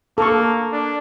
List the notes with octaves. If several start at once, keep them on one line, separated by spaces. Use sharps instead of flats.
A#3 A4 C#6
D4